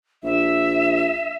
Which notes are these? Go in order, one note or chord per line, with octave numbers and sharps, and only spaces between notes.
A#1 E5